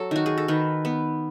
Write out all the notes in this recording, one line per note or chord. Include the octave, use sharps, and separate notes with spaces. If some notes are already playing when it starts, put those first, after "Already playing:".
Already playing: F#3 A4
D#3 F#4
G#4
A4
D#3 B4
B3